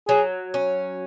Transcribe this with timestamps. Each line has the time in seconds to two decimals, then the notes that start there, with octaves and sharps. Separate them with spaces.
0.08 F#3 G#4
0.54 C#4